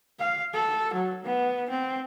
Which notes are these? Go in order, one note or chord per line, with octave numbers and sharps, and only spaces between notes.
F5
A4
F#3
B3
C4